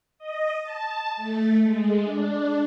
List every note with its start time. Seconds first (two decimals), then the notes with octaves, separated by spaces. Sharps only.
0.19 D#5
0.63 A5
1.17 A3
1.63 G#3
2.04 D4